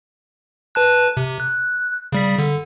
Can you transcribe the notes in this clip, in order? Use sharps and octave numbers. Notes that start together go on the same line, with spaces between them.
B4 A5 F#6
C3
F#6
C#3 G3 B6
D3